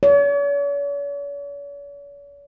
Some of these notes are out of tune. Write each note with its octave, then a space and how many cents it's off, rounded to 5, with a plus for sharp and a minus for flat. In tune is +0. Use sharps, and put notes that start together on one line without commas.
C#5 +45